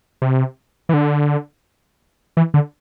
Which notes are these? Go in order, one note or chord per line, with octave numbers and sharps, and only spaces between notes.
C3
E3
D3
E3
D3